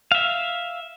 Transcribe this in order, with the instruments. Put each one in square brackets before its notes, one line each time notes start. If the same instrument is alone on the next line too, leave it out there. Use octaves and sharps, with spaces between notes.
[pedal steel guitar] E5 F5